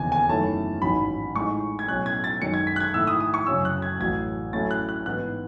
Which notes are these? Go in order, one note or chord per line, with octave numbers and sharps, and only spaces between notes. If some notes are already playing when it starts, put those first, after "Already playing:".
Already playing: E1 D#2 C#3 E3 G#5
G#5
F#2 D#3 A3 C#4 E4 A5
A1 G#2 D#3 F#3 C#4 B5
A2 G#3 D#4 C#6
G#6
B1 A2 F#3 C#4 F#6
G#6
A6
F#2 D#3 G#3 D#4 C#7
G#6
B6
F#6
G#6
G#2 D#3 A3 E4 E6
D#6
D#6
C#6
F#2 C#3 F#3 C#4 E6
F#6
G#6
A1 A2 F#3 G#6
A2 F#3 A3 C#4 E4 A6
F#6
F#6
G#2 E3 B3 D#4 F#6